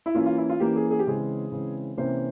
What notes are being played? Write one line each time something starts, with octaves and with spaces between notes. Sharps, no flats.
E4
E3 A#3 C#4 F4
F4
E4
F4
E3 A#3 C#4 G4
G#4
G#4
G4
C#3 E3 G#3 C4 G#4
C#3 E3 G#3 C4
C3 E3 A#3 C#4 C5